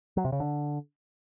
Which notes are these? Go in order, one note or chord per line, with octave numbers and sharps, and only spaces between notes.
F#3
C3
C#3
D3